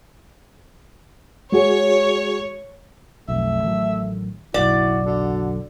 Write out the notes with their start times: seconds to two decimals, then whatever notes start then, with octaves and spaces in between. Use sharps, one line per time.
1.52 G#3 F#4 G#4 C#5
3.28 B1 F2 A3 E5
3.63 A1 D#3 F#3
4.54 F#1 B1 E4 F#4 D5
5.05 D3 F#4